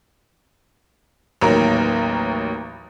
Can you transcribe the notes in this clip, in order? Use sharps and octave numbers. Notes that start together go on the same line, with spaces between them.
A1 D#2 F#3 A#4 A#5